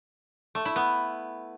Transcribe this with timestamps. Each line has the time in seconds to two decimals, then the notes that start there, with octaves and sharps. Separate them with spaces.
0.55 A3
0.65 E4
0.76 B3